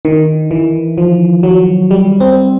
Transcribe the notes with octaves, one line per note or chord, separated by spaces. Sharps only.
D#3
E3
F3
F#3
G3
C4